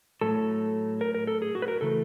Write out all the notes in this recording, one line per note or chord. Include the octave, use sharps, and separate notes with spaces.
A2 F#3 A3 A4
A#4
A#4
A4
G#4
F#4
B4
A#4
C#3 E3 A3 A4